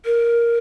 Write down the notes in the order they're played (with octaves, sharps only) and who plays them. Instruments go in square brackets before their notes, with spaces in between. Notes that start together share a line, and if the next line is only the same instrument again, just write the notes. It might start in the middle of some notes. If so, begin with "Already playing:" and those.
[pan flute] A#4